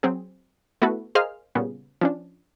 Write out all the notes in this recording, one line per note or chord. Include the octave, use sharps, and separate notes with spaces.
F#3 C4 G#4
A3 B3 E4 F#4 A4 B4
G#4 A#4 C5 D#5 F5 F6
A#2 C#3 G3 B3
F3 C#4 D4